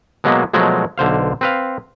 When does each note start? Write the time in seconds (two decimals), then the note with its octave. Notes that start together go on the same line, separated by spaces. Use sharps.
0.24 B2 F#3 G#3 A#3 B3
0.53 B2 F3 F#3 G#3 A3
0.98 B1 D3 C5 F5
1.41 C4 B4 F5